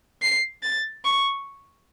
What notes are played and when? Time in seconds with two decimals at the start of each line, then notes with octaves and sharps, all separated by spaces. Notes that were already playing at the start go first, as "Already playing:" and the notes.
0.22 C7
0.63 A6
1.05 C#6